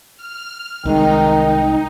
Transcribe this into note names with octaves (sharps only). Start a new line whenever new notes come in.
F6
C2 D#3 G#3 D#4 G5